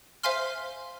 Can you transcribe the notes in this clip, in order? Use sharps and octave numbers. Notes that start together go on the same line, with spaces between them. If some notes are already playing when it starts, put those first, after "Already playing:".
C5 E5 F5 G#5 C6 F6